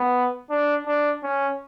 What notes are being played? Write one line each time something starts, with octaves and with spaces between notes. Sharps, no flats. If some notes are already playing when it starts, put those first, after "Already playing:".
Already playing: B3
D4
D4
C#4